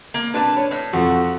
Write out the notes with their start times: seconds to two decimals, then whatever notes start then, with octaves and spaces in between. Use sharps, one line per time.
0.14 A#3
0.34 D4 B4 A5
0.57 C#5
0.71 A2
0.93 F2 F#4